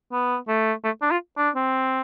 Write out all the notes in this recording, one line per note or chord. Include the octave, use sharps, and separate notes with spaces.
B3
A3
A3
D4
F4
D4
C4